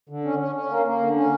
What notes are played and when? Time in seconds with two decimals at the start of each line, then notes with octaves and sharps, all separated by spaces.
0.09 D3
0.25 C#4
0.39 C#4
0.55 C#4
0.70 A#3
0.86 A#3
1.01 D3
1.16 C#4